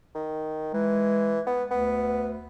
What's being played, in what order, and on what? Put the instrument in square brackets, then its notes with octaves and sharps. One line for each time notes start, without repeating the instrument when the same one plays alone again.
[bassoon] D#3
[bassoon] E3 [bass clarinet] G#3
[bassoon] B3
[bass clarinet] D2 [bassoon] B3